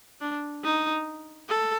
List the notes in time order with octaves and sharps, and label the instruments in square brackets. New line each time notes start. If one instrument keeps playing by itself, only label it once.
[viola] D4
D#4
A4